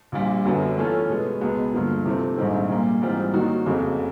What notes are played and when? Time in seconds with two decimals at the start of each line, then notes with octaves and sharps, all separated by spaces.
0.12 A#1 A#2 G3
0.45 G1 F#2 D3 F#3 B3
0.77 E3 A3 C#4 F4 A4
1.09 B2 G#3 B3
1.41 C#2 B2 G#3 B3
1.74 G2 D3 F3 A#3
2.06 C3 F3 A3 C4
2.37 A#1 G#2 D#3 G3 C4
2.70 A#2 G3 A#3
3.02 G#2 E3 G3 C4 F4
3.33 D#3 F#3 A#3 D#4 F#4
3.66 F#1 F2 C#3 F#3 A3